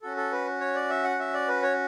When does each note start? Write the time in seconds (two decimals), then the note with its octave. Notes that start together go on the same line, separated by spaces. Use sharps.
0.02 C#4 F#4 A4
0.17 A4
0.32 B4
0.60 C#5
0.75 D5
0.90 E5
1.04 F#5
1.19 E5
1.33 D5
1.48 B4
1.63 C#5